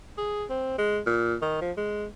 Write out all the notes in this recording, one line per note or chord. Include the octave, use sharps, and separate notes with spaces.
G#4
C4
G#3
A#2
D#3
F3
G#3